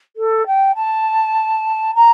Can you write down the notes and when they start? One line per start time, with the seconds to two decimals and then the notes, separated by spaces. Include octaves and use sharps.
0.17 A4
0.47 G5
0.75 A5
1.95 A#5